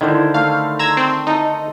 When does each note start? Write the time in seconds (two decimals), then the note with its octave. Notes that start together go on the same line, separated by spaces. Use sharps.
0.01 D3 D#3 E4 C5
0.34 A3 F5
0.79 A#5 C6 E6 G#6
0.97 C4
1.27 D#4 A4